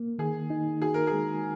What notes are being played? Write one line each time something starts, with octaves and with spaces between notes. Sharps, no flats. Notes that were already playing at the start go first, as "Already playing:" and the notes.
Already playing: A#3
D#3 G#4
D#4
F#4 G#4
A#4
G#4
G#3